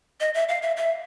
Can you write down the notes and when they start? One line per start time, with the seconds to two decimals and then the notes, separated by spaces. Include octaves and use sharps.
0.20 D#5
0.34 E5
0.49 F5
0.62 E5
0.77 E5